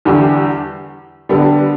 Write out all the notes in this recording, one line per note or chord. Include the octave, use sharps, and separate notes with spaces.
E2 D3 G3
D3 G3 B3 D4